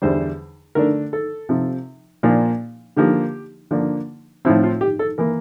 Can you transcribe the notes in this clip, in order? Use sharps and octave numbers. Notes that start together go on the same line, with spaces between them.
E2 D3 G3 C5
D3 A3 D4 A#4
A4
C3 F3 C4
A#2 F3 A#3 D4
D3 F3 A#3 G4
D3 F3 A#3 D4
A2 F3 C4 E4
F4
G4
A4
E3 A#3 A#4